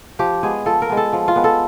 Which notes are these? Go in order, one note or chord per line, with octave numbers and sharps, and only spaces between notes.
F3 G4
G#3 B3 G#4
F3 A4
A#4
G#3 B3
A4
F3
F4
G#3 B3
A4